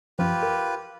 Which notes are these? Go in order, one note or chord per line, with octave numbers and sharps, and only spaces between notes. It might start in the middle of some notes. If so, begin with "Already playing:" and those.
F#2 F3 F4 G4 B4
A#4